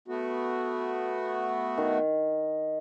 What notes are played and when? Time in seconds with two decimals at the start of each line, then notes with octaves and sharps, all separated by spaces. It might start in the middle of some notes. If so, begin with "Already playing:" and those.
0.08 A3 B3 F#4
1.78 D#3